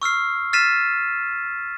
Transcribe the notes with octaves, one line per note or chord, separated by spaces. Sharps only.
C#6 E6 F6 C7
F6 A6 B6 C7 D#7 E7